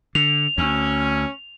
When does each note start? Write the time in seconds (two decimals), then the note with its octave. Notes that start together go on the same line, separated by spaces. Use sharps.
0.15 D3 F7
0.58 D2 C#4